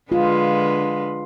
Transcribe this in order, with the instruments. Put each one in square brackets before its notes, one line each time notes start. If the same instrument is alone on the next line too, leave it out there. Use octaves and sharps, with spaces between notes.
[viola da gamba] D3 G#3 B4 [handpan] F4